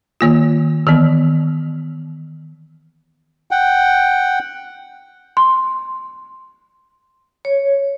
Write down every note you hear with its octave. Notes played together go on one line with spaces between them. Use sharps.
D#3 A#3 F4
D#3 E3 B3
F#5 G5
C6
C#5